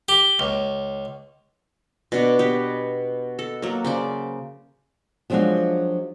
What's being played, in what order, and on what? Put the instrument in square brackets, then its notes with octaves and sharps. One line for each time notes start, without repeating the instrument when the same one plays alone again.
[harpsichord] G4
C#2
[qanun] B2 D4
B3 G4
A4
F#3 A#3
C#3 C5 D5
[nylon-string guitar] F3 F#3 G#3 D4 F4 F#4